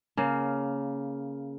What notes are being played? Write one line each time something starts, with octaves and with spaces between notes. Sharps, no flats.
C#3 A#3